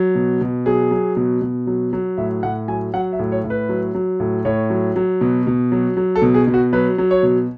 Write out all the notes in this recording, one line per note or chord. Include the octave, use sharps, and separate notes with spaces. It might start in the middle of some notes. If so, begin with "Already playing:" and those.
Already playing: F#3
B2
B2
F#3 G#4
F#3
B2
B2
F#3
F#3
A2 E5
A2 F#5
F#3 G#5
F#3 F#5
E5
A2
C#5
A2
B4
F#3
F#3
A2
A2 C#5
F#3
F#3
B2
B2
F#3
F#3
A4
B2
G#4
B2
F#4
F#3 B4
F#3
C#5
B2